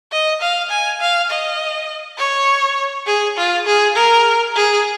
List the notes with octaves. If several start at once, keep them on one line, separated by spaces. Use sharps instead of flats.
D#5
F5
G#5
F5
D#5
C#5
G#4
F4
G#4
A#4
G#4